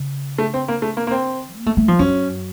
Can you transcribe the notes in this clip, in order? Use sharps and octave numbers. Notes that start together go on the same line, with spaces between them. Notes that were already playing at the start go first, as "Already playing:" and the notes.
Already playing: C#3
A3
C4
A#3
A3
A#3
A#3
C4
A#3
A3
A3
F3
F#2 C#4